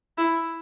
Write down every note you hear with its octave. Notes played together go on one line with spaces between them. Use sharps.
E4